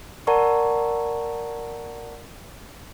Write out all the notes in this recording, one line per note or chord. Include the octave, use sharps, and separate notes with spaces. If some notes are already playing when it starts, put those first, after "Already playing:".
A#4 D5 F#5 A5 A#5 C#6